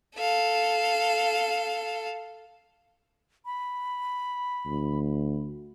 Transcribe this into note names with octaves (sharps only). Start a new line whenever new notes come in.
A4 F5
B5
D2